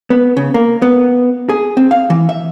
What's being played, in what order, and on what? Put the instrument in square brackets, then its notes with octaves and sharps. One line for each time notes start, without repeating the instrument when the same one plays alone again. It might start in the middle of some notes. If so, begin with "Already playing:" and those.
[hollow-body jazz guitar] B3
C#3
A#3
B3
G#4
C4
F5
E3
E5